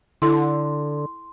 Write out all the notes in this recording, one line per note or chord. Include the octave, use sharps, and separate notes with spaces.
D3 E4 A4 C6